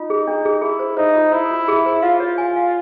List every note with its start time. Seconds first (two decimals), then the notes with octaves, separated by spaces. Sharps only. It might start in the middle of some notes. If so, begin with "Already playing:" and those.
Already playing: D#4 F4
0.10 G#4
0.27 D4
0.45 G#4
0.62 E4 G#4
0.79 C5
0.97 D#4 C5
1.15 F4
1.32 E4 C5
1.51 F4
1.68 G#4
1.86 C5
2.02 F4 F5
2.20 C#5
2.38 G#5
2.56 F5